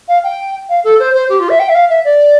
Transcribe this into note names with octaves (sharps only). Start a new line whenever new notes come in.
F5
G5
F5
A4
C5
C5
G4
F4
E5
G5
E5
F5
E5
D5